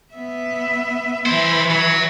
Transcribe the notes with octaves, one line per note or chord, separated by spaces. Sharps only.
B3 E5
E3 E4 C5 E5
F#3